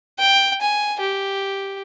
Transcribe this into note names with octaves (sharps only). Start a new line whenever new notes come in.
G5
G#5
G4